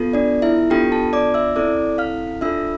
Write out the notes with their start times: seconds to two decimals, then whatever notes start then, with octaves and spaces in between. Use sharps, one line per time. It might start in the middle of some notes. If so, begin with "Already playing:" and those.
Already playing: B3 F4 A4
0.13 D4 D5
0.42 E4 E5
0.70 B3 D4 F4 G4 A4 G5
0.92 A4 A5
1.13 D5 D6
1.34 E5 E6
1.56 C4 E4 A4 D5 D6
1.98 F5 F6
2.41 D4 F4 A4 E5 E6